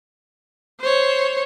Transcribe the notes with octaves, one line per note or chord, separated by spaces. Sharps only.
C5 C#5